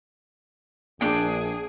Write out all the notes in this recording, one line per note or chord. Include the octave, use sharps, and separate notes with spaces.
A#1 D4 G#4 G5